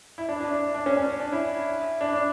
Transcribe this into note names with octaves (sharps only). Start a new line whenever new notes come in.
E4
D4
D4
D4
D4
C#4
C#4
D4
E4
D4
D4